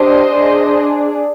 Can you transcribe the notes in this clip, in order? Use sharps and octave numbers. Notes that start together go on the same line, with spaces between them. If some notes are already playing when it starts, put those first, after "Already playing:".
Already playing: D4 G4 C5 D#5
D4 G#4